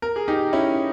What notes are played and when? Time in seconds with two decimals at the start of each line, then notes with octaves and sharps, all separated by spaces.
0.02 A#4
0.16 G#4
0.28 D#4 G4
0.53 C#4 E4